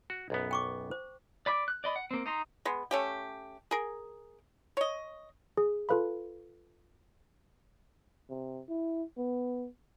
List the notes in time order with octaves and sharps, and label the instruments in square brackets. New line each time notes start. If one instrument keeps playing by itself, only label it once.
[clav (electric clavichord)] F#4
B1 F#2 B3
[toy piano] G5 C#6 D6
C5
[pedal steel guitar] D5 B5 D6
F#6
D5 D#5 B5
F#5
A#3 C4
D#4 A#5 C6
[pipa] G#3 B3
A3 C#4 G4
G#4 A#4
C#5 D#5
[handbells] G#4
F4 A4 B4 F5 B5
[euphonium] C3
E4
B3